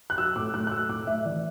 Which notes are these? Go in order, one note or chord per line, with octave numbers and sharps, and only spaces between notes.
F#6
F#3 E6
A2 D6
A2 F#6
F#6
F#3 E6
A2 D6
A2 E5
E3 D5